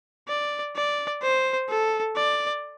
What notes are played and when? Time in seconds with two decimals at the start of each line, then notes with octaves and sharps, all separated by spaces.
0.28 D5
0.76 D5
1.22 C5
1.69 A4
2.16 D5